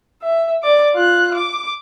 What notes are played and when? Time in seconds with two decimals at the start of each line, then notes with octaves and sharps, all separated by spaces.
0.23 E5
0.63 D5 D6
0.94 F4 F#6
1.34 D6